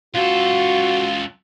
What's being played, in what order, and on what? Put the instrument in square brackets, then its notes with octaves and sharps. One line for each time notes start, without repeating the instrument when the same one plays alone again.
[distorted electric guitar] C#2 A4 [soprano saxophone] F4 [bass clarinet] F#4